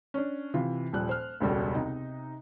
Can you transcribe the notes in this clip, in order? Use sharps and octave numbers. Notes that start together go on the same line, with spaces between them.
C#4 D4
C3 E3 F4
D#1 F3 G3 F#6
C5 F6
E1 C#2 C#3 G3 F#4 A4
C3 D#4